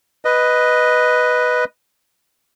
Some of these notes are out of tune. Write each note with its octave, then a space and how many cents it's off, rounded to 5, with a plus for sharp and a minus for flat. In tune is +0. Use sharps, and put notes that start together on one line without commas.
B4 +0 D#5 +0